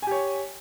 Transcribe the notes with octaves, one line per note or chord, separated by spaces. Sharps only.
G4 C#5 G#5